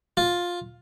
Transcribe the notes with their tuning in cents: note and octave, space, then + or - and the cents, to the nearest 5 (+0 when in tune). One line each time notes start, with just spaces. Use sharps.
F4 +10